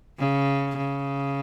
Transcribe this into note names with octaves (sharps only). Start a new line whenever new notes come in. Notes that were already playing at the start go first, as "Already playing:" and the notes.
C#3
C#3